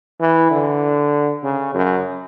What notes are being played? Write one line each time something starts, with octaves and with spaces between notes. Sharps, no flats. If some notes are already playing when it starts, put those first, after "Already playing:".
E3
D3
C#3
F#2